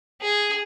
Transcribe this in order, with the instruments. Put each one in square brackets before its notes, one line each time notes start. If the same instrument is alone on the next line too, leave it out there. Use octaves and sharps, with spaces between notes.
[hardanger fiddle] G#4